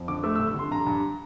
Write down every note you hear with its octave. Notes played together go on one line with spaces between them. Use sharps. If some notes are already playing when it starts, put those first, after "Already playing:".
Already playing: F2
D3 D6
A3 E6
E6
G2
E6
D3 C6
G2 A#5
G2